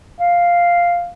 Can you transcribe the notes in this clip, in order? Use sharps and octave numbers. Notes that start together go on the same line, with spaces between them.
F5